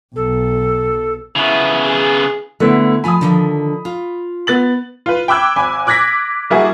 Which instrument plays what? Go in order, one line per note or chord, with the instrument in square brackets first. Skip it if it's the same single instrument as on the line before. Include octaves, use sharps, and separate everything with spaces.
[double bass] B1 [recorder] A4
[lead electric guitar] C#3 B3 [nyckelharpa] E4
[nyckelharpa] G#4
[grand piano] D3 B3 E4 [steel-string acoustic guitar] A3
[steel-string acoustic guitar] F3 F4 G#5 [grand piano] B5 D#6
[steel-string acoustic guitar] D3 D#3 F3
F4
[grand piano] B3 A6 F#7
[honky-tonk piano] F4 B4
G5 B5 D6 E6 F#6 G#6
G#1 G#5 B5
D6 F#6 G#6 A#6 B6
G3 A#3 E4 F#4 G#4